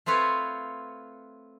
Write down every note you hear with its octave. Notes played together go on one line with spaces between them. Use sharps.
A3 C4 F4 B4 C#5